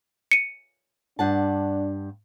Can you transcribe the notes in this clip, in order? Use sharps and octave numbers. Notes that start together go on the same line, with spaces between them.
C#7 D#7
G2 D4 F#5 A5